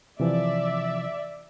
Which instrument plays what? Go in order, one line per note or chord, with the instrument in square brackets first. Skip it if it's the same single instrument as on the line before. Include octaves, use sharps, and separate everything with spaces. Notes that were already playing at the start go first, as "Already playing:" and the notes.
[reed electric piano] C3 E3 F3 [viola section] D5 E5